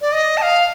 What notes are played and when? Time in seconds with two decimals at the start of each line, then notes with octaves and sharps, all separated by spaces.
0.01 D5
0.12 D#5
0.37 A5
0.42 F5